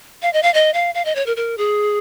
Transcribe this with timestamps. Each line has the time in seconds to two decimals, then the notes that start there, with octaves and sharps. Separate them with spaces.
0.22 F5
0.33 D#5
0.43 F5
0.54 D#5
0.74 F5
0.95 F5
1.05 D#5
1.16 C#5
1.26 A#4
1.37 A#4
1.58 G#4